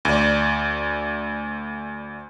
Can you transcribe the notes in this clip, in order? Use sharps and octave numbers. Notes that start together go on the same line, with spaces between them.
D2 D5